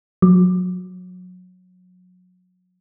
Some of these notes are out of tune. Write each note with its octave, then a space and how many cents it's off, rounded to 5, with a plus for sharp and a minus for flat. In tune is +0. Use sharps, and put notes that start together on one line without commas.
F#3 -25